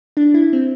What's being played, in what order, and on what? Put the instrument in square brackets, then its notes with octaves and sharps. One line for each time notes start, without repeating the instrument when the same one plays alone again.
[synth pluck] D4
E4
C4